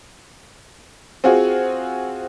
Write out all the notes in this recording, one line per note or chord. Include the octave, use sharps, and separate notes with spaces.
C4 F4 F#4 G#4